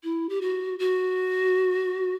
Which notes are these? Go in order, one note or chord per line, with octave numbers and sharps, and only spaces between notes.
E4
G4
F#4
F#4